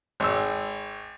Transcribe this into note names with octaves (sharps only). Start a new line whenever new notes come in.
G#1 E6